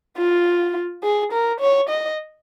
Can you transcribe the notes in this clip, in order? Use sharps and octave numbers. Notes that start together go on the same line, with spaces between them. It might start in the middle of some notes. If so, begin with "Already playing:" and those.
F4
G#4
A#4
C#5
D#5